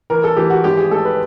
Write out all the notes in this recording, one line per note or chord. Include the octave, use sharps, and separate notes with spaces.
E3 A#4
A4
E3 G4
F#4
G#1 G4
G#4
G#3 A4
B4